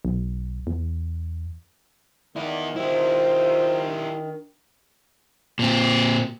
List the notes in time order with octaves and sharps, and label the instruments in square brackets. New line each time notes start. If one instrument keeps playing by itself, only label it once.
[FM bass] B1
E2
[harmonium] D#3 [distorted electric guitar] B3 E4 [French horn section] D5
[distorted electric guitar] E4 G4 [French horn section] F4 C5
[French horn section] D4
[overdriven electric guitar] A#2 C4